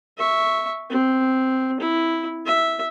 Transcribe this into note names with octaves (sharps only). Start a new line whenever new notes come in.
E5 C#6
C4
E4
E5